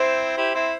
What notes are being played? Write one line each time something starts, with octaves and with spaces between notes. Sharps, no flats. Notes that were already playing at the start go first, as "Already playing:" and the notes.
Already playing: C4 E4 C5
E4 G4
C4 E4